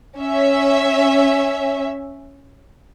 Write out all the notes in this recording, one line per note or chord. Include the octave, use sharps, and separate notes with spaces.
C#4 E5